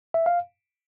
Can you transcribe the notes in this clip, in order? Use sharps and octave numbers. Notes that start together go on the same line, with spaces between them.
E5
F5